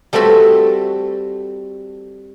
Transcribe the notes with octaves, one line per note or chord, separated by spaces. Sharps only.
G3 A3 C4 F#4 A4